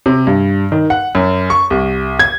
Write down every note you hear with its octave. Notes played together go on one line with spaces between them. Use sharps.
C3
G2
D#3
F#5
F#2
C#6
C2
G#6